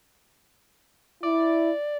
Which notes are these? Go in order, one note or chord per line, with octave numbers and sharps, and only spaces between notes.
E4 D5